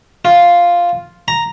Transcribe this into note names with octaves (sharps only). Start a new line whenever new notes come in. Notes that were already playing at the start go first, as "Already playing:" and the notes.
F4
A#5